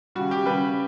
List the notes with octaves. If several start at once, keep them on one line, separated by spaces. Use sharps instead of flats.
C#3 G3 F#4
G4
C#3 G3 B4